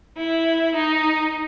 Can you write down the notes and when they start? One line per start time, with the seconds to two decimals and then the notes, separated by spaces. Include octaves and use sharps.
0.17 E4
0.75 D#4